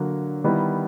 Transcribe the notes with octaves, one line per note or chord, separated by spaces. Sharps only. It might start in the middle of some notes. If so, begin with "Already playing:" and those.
Already playing: D3 F#3 A#3
D#3 G3 B3 E4